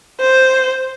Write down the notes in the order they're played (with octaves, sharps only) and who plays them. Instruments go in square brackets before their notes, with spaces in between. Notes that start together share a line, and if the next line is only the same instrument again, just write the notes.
[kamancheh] C5